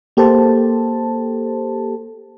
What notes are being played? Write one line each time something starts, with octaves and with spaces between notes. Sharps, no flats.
A#3 G4 A4 C5 A5